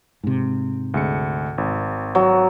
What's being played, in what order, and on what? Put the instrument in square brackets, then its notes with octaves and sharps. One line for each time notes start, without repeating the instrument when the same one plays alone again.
[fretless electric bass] G#2 C3
[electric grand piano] D2 G#3 C#7
G#1
[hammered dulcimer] F#3